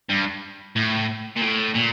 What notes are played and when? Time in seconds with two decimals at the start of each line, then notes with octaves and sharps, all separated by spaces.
0.09 G2
0.76 A2
1.36 A#2
1.41 A2
1.75 A#2